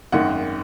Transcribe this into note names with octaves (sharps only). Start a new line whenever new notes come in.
G#1 F#2 D#3 F#5